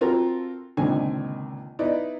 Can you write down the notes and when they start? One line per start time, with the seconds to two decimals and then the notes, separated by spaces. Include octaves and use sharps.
0.01 C4 F4 F#4 A4 A#4
0.77 C#2 A#2 D3 D#3 C4 G#5
1.79 B3 D#4 E4 B4 D5 D#5